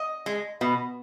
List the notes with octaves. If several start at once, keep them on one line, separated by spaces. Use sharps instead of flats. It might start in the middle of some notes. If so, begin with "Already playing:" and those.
Already playing: D#5
G#3
B2